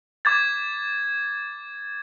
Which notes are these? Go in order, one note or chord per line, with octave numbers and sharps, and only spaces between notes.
D6 G#6 A6